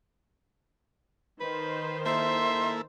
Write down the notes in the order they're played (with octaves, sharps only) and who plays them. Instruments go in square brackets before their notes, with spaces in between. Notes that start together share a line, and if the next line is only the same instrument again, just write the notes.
[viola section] D#3 C5 [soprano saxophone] B4
[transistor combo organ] A#3 E4 A4 [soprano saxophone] E5 [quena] C6